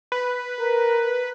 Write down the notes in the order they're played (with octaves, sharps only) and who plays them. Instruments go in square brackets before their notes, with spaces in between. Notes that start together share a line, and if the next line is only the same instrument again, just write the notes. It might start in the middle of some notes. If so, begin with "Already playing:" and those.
[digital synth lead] B4
[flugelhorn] A#4